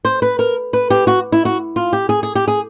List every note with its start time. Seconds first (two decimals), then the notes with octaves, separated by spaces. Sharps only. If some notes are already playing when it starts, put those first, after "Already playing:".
0.05 C5
0.22 B4
0.39 A#4
0.73 B4
0.90 G4
1.07 F#4
1.32 E4
1.45 F#4
1.76 F4
1.93 G4
2.09 G#4
2.23 G#4
2.35 G4
2.48 G#4